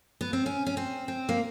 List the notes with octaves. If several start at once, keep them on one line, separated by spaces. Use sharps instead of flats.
B3
C4
C#4
C#4
C4
C4
A#3